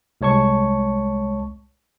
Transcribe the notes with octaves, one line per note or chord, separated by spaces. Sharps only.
C2 G#3 C#5 A5 C#6